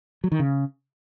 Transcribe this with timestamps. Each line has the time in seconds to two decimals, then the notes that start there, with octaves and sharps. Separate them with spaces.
0.24 F#3
0.32 D#3
0.40 C#3